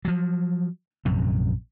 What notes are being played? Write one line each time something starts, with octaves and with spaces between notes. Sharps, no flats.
F3 F#3
A#1 F#2 C3